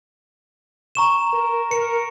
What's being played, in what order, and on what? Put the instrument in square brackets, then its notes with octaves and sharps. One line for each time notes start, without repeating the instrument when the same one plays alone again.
[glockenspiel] A#5 C#6 E7
[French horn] A#4
[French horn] A#4 [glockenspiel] C#7